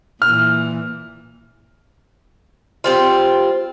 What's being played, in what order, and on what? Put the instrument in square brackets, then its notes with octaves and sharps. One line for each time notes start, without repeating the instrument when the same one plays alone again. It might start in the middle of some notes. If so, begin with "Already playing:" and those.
[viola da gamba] A#2 E3 [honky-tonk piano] F6
[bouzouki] G3 C4 F4